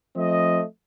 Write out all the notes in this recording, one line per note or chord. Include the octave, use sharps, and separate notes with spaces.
F3 A3 C4 D#5